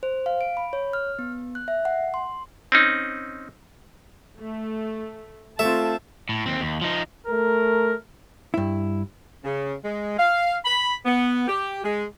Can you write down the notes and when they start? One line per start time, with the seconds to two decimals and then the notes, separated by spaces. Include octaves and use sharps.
0.03 C5
0.26 F5
0.41 D7
0.57 B5
0.73 C#5
0.93 F6
1.19 B3
1.55 F#6
1.68 E5
1.85 F#5
2.14 C6
2.72 C4 C#4 D#4
4.40 A3
5.59 A3 C4 F4 E5 A5
6.29 A2
6.46 D#2 C4
6.60 D#2
6.82 F3 D#4
7.26 A3 A#4
8.54 G2 E4
9.44 C#3
9.84 G#3
10.18 F5
10.65 B5
11.05 B3
11.48 G4
11.84 G#3